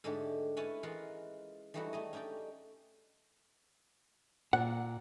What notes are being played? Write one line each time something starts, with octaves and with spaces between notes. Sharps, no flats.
G#2 D3 G#3 A3 D4 G4
C#4 E4 B4 C#5 G#5 A5
E3 G#3 F4 A#4 F#5
E3 G3 A3 D#4 E4 F#4
A3 G#4 D#5
C#4 D#4 G4 D5 G5
A#2 F#5